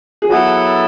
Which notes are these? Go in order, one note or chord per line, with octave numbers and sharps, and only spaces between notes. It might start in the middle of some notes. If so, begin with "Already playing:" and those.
G#4
F#3 B3 E4 F#4 A4